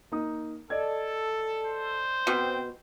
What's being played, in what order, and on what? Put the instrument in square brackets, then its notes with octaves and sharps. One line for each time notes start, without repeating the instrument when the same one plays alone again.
[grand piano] A#3 D#4 D#6
[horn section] A4 [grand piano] D5 D#5 G#6
[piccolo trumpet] C5
[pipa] B2 [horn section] C4 G5